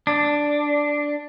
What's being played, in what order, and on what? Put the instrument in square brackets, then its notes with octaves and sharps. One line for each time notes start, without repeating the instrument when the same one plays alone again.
[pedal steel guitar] D4